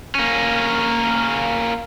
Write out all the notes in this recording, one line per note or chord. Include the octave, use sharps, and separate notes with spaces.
A#3 C#4